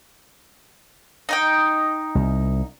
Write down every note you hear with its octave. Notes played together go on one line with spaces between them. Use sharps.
D#4 D#5 G5
C2